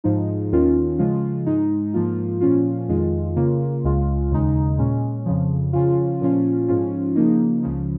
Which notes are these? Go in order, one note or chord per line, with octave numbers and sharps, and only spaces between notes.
G#2 F3 G#3 D#4
D#2 D#3 C#4 F4
C#3 F3 G#3 F4
G#2 G#3 D#4
G#2 F3 A#3 F4
A#2 F3 C#4 F4
F2 D#3 G#3 F4
C#3 A#3 F4
C#2 C#3 G#3 F4
D#2 C#3 G#3 D#4
A#2 G#3 C#4
F2 C#3 F3
C#3 F3 C#4 F4
A#2 F3 C#4 F4
G#2 F3 C#4 F4
C#3 F3 A#3 D#4
C#2 C#3 F3